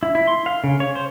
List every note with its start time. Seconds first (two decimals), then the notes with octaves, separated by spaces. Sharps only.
0.03 E4
0.15 E4
0.27 C6
0.46 F5
0.64 C#3
0.80 C#5
0.95 C5